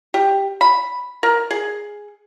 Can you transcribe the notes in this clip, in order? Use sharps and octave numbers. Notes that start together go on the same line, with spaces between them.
G4
B5
A#4
G#4